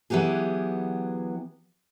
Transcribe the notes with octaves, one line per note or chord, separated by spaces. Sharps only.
E3 F#3 B3 G4 G#4